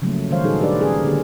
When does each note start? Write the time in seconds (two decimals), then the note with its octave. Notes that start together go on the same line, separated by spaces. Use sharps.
0.02 C#3 F3 F#3 A3 A#3
0.31 D#3 G3 G#3 C5 C#5 F5
0.44 A#2 G3 D#4 F#4 G#4 A4
0.61 D4 G4 B4 D5
0.80 C#4 G#4 A#4
1.04 D3 A#3 G4 G#4